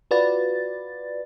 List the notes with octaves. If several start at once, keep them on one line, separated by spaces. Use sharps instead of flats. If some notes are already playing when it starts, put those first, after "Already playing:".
F4 F#4 B4 D5 A6